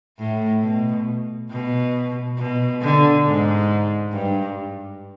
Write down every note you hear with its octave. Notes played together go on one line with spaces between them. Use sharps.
A2
B2
B2
B2
D3
G#2
G2